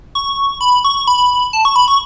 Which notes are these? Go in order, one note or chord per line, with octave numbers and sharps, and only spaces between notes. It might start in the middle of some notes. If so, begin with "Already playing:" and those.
C#6
B5
C#6
B5
A5
C#6
B5
C#6